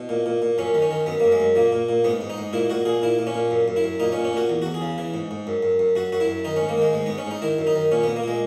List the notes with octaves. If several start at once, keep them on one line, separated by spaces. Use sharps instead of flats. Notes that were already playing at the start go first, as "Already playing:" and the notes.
Already playing: B2 E4
A#2
A#2
A#2
F#2 C#4
D#3
C#4
D#3
F#2 B3
F#2 A#3
G#3
F#2
A#2 A#3
A#2
A#2
G#2 B3
G#2
D#4
G#2
A#2 E4
A#2 F#4
A#2 G#4
A#2 E4
A#2
C#4
A#2
F#2
F#2
E4
F#2
A#2 D#4
C#4
A#2
C#4
A#2 F#4
E2
E2 F#4
G#4
C#3
E3
G#2
G#2
F#2
F#2
F#2
F#2 F#4
F#2 F#4
E4
F#2
D#3 D#4
C#4
G#2
A#3
D#3 G#3
G#2 G#3
G#2 B3
C#4
G#2 D#4
D#3 E4
F#2
D#4
D#3
A#2 C#4
A#2 B3
A#3
A#2 G#3